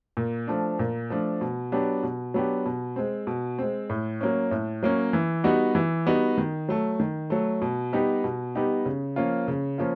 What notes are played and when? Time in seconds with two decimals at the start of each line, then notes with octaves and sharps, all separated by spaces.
0.17 A#2
0.47 F3 A3 D4
0.79 A#2
1.10 F3 A3 D4
1.41 B2
1.72 F#3 B3 D4 G4
2.03 B2
2.34 F#3 B3 D4 G4
2.66 B2
2.96 G#3 C4
3.27 B2
3.59 G#3 C4
3.90 A2
4.21 F#3 A#3 C#4
4.51 A2
4.83 F#3 A#3 C#4
5.13 E3
5.44 G3 B3 D#4 F#4
5.75 E3
6.06 G3 B3 D#4 F#4
6.38 D#3
6.69 F#3 A3
7.00 D#3
7.30 F#3 A3
7.62 B2
7.93 G3 B3 D#4 G4
8.24 B2
8.55 G3 B3 D#4 G4
8.86 C#3
9.16 F3 A#3 C#4 F4
9.48 C#3
9.78 F3 A#3 C#4 F4